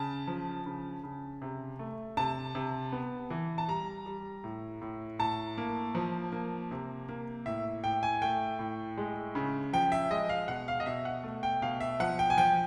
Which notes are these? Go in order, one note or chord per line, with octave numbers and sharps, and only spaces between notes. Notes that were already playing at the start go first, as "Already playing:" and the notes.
Already playing: C#3 A5
F3
C#3
C#3
C3
A3
C3 A5
C3
B3
E3
A5
G3 A#5
G3
A2
A2
A2 A5
A#3
F3
A#3
C3
A#3
A2 E5
A2 G5
G#5
A3 G5
A2
G#3
C#3
F3 G5
E5
G#3 D#5
F5
B2 F#5
F5
D#5
B2 E5
F#5
A3
G5
B2 F5
E5
F3 F#5
G5
G#5
F3 G5